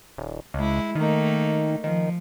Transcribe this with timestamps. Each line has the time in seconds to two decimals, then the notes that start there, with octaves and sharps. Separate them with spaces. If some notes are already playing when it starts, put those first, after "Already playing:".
0.17 D#1
0.54 C#2 G#3 E4
0.95 D#3 A3 A#3 D#4
1.84 D#3 F3